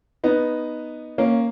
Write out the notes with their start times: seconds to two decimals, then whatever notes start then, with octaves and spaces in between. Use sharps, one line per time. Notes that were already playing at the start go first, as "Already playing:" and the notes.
0.24 B3 D#4
1.18 A#3 C#4